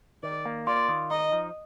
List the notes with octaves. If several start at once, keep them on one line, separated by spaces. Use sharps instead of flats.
D#3 D5
A#3
F4 D5
D#3
D#4 D#5
F3